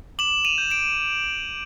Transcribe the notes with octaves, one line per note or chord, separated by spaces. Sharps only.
D6 E7 F#7
D#7 F7
G6
D7 E7